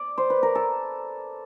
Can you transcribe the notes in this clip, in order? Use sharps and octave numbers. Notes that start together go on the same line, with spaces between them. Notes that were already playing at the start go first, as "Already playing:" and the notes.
Already playing: D5
C5
B4
A#4
A4